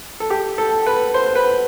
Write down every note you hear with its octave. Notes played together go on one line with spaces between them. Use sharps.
A4
G4
A4
B4
C5
B4